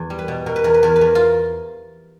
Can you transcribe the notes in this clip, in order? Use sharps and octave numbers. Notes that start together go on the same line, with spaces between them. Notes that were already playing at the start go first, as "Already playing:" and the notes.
Already playing: E2
G3
B4
B2
B2 A#4
B4
E2 A#4
B4
E2 A#4
B4
E2 A#4
F4